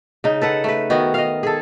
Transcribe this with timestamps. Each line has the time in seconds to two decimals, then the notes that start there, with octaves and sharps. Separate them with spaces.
0.24 C#3 D#4
0.41 A4 B4 F#5
0.64 A3 B4
0.90 D#3 B3 F#4
1.14 D#5 F5
1.43 G#4 A4